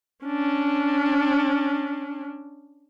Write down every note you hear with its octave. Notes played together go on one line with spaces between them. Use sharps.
C#4 D4